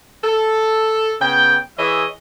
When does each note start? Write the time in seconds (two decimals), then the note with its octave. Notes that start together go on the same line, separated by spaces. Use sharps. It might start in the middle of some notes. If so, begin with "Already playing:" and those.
0.24 A4
1.21 C#3 B3 G5
1.78 E3 G#4 C#5 D#5 E5